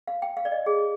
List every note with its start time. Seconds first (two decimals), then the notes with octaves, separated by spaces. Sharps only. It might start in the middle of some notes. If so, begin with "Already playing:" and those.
0.07 F5
0.22 G5
0.37 F5
0.45 D5
0.52 D#5
0.66 G#4